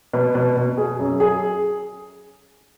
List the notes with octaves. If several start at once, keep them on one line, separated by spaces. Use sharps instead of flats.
B2
B2
B2
G#4
F#2
G#4